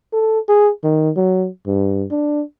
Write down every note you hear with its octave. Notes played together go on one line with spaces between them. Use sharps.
A4
G#4
D#3
F#3
G2
D4